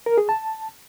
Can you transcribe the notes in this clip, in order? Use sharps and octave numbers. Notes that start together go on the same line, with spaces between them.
A#4
G#4
A5